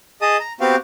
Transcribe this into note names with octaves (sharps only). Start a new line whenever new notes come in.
G#4 D#5 A5 D#6
A#5
B3 C4 F#4 G4 F5